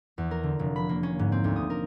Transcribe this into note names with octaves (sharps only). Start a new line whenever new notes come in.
E2
A#4
D3
F1
B5
A#3
C#4
G#2
C4
D2
D#6
A#4